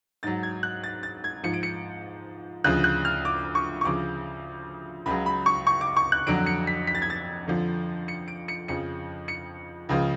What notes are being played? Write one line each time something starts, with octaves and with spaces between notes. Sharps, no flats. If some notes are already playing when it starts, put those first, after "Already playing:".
G#2 F#3 A6
G#6
F#6
A6
A6
G#6
G#2 F3 C#7
D7
C#7
D2 C#3 F3 F#6
F#6
F6
D6
C#6
C#6
D2 C#3 F3 D6
C#2 C#3 F#3 B5
B5
C#6
C#6
D6
C#6
F#6
F2 D3 F#3 D7
C#7
B6
B6
A6
G#6
A6
F2 D3 F3
C#7
D7
C#7
F2 C#3 F3 C#7
C#7
C#2 C#3 F3